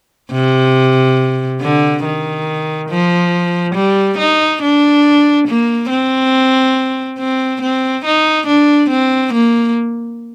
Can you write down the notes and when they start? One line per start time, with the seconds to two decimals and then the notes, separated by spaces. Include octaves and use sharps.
0.32 C3
1.61 D3
2.04 D#3
2.90 F3
3.75 G3
4.18 D#4
4.62 D4
5.48 A#3
5.89 C4
7.19 C4
7.61 C4
8.05 D#4
8.46 D4
8.89 C4
9.33 A#3